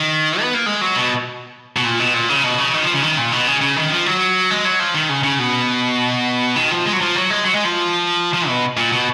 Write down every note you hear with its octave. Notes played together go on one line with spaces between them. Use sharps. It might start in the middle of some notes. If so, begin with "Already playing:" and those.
Already playing: D#3
B3
A#3
G#3
F#3
B2
B2
A#2
B2
A#2
C#3
B2
C#3
D#3
F3
C#3
D#3
A#2
B2
C#3
C#3
D#3
F3
F#3
G#3
F#3
F3
D#3
C#3
C#3
B2
D#3
F3
G#3
F#3
F3
F#3
G#3
F#3
G#3
F3
F3
B2
A#2
B2